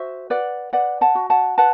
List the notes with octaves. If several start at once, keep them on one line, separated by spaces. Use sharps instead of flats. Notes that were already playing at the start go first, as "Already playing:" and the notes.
Already playing: F#4 C5 E5
B4 D5 F#5
B4 D5 F#5
F#5 A5
F#4
F#5 A5
B4 F#5 A5